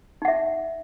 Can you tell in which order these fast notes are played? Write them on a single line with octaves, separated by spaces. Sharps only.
D#4 F#5 E5